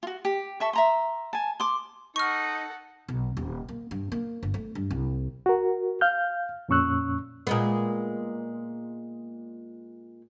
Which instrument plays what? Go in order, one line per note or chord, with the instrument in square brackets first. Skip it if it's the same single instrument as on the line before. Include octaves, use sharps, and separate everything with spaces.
[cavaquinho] F4 F#4
G4
A4 E5 C#6
E5 A#5 C6
G#5 A5
C6 D6
[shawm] D#4 [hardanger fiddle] A4 F#5 [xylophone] C#6 F6
[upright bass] B1
D#1
A#3
G2
A#3
G1
A3
G2
C2
[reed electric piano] F#4 A#4
F5 F6 G6
F2 A#2 C#4 C#6 E6 F#6
[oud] A#2 G#3 B3